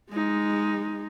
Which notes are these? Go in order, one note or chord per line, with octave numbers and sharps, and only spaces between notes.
G#3 D#4